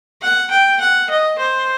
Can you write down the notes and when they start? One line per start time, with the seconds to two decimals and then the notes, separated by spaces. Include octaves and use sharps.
0.21 F#5
0.51 G5
0.80 F#5
1.10 D#5
1.38 C5